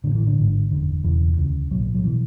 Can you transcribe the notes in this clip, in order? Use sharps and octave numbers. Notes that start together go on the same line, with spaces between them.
A1 A2 D3
E3
D3
G#1 G#2
F#1 E2 D3
E1 E2 C#3 E3
D2 C#3
B1 A2 F#3
F#3
B2 E3